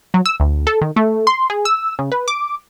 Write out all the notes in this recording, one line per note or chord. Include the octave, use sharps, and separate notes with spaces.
F#3
E6
D2
A4
D#3
A3
C6
G#4
E6
C#3
B4
D6